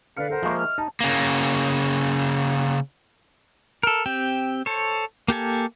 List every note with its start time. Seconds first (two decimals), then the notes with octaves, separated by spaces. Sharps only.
0.17 D3 B4 D5 F5 F6 C#7
0.30 A4 A#4 C5 F#5
0.42 F3 G#3 A#3 D#5 E5 C#6
0.57 F6
0.78 D#4 A5
1.00 C#3 A#3
3.83 A4 A#4
4.06 C4 G4 G5
4.66 A4 C5 C#5
5.28 A#3 G4 A4 G#5